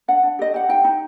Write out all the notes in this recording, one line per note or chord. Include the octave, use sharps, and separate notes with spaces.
D4 F#5
D4
G4 D#5
G4 F#5
D#4 G5
D#4